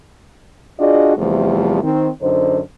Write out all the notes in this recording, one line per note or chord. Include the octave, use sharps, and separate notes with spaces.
D4 F4 F#4 G#4 D5 D#5
E2 C3 F3 G3 A3
D#3 C4 D#4
F#2 D3 D#4 C5